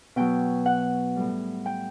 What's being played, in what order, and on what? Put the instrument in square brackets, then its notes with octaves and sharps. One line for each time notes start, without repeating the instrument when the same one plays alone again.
[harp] B2 F#3 G5
F#5
A2 G3
G5